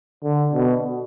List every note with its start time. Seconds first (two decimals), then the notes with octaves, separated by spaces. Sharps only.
0.24 D3
0.53 B2